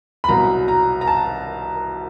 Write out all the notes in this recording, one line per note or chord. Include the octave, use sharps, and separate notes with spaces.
B5
C2 B2 F#3 A#5
A#5
A#5
A5